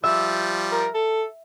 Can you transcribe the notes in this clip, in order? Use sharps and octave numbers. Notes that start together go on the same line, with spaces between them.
F3 G3 E5
A#4
A4